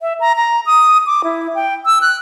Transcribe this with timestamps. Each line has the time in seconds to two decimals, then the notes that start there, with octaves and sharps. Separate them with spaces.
0.01 E5
0.20 A#5
0.36 A#5
0.66 D#6
1.06 D6
1.24 E4
1.55 G5
1.86 E6
2.02 F#6